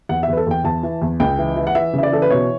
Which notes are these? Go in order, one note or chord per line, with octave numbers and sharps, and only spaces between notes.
E2 F#5
E5
E2 B4
A4
E2 G5
E2 A5
E3
E2
C#2 G5
E3
E3
F#5
E3 E5
C#3 E5
D5
E3 A4
B4
B2 C#5